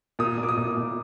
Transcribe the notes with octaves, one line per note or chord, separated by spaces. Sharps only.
A#2 D#6
A#2
D6
D#6
A#2
A#2